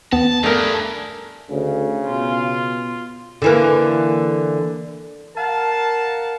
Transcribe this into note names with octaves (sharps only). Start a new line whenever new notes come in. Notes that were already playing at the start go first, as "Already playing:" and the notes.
D#2 B3 A5
G2 A3 D4 G#4 A#4
D2 C#3
B2 F4
D3 E3 A#3
A#4 F5 F#5 A5